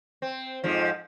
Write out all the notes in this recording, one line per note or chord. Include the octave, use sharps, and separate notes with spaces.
C4
F2 G#2 F3